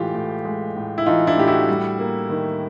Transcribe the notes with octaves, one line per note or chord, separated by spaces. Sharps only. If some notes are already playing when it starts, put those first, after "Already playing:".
Already playing: A2 E3 G#3 F4 G4
A2
G#3
A2
E4
E3 D#4 F4
D4 E4
A2 G4
E4 F#4
G3
A#3
D#3